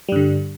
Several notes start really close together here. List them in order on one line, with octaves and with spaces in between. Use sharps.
G3 G2 D3